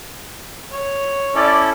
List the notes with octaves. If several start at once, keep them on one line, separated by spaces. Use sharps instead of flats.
C#5
C#4 E4 A4 D5